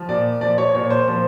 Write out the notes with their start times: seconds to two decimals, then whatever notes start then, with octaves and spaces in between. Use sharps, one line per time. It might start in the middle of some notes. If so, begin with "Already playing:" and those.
Already playing: F3
0.09 A#2 D5
0.41 F3 D5
0.58 C#5
0.74 A#2 C#5
0.90 C5
1.08 F3 C5